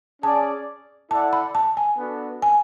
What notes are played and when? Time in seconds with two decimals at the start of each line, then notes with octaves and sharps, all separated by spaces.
0.23 C#4 G#4 D5 A5
1.11 E4 A4 D5 F#5 A5
1.33 B5
1.55 A5
1.77 G#5
1.98 B3 D4 F#4 A4
2.42 G#5